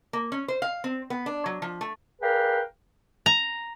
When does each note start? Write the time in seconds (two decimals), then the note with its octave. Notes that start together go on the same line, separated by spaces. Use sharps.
0.13 A#3
0.32 C#4
0.48 C5
0.62 F5
0.84 C4
1.10 B3
1.26 D4
1.46 F#3
1.62 F3
1.81 A3
2.22 G#4 A#4 B4 D5 F5 G5
3.26 A#5